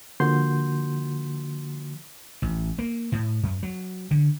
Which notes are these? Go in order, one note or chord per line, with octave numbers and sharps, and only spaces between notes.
D3 F3 A#3 F#4 C6 G6
A1
A#3
A2
F#2
F#3
D3